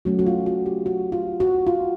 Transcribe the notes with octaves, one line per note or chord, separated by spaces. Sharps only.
F#3 A3 C#4 F#4
F#4
F4
F#4
G4
F#4
F4
F#4
F4